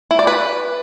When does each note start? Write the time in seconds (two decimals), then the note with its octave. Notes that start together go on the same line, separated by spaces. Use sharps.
0.11 E4
0.19 D5
0.27 B4